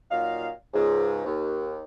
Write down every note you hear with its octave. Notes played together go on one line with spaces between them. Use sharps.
A#2 F#3 D#4 F5
C#2 G#2
D#2